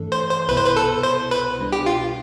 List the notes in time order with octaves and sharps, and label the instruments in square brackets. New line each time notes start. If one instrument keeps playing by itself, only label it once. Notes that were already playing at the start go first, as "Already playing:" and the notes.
Already playing: [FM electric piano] G2 E3 A3 D4 A4
[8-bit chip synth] C5
C5
[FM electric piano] C2 B2 B3 E4 [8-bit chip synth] B4
[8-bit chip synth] C5
B4
A4
C5
B4
[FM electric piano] B2 G3 D4
[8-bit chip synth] G4
F4